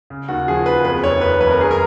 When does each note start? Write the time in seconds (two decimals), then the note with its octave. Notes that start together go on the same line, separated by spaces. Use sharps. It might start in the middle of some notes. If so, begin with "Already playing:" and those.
0.10 C#3
0.28 D#2 F#4
0.48 F3 G#4
0.66 D#2 B4
0.84 F2 B4
1.03 F1 C#5
1.21 D#3 B4
1.39 F1 B4
1.51 A#4
1.59 F#2 G#4
1.71 A#4